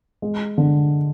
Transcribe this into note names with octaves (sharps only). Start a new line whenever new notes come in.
G#3
D3